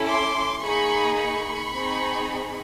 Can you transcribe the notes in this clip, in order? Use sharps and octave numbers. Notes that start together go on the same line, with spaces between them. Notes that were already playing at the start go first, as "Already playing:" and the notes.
Already playing: C#4 E4 A4
C6 D6
A#3 D#4 G#4 B5 C#6
B5 C#6
C4 D#4 G#4